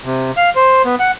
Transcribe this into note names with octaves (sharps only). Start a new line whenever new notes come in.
C3
F5
C5
B3
F#5